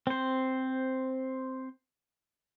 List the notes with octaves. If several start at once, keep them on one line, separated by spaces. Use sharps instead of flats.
C4 C5